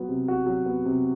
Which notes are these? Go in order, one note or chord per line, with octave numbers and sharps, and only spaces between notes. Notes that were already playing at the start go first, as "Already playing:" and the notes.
Already playing: F#3 B3
C3
F#4
F#3
B3
C3